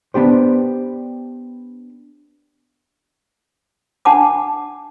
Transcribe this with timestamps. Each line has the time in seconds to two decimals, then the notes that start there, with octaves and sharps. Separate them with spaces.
0.14 B3 D4 G4 C5
4.05 D4 F#5 A5 B5 D6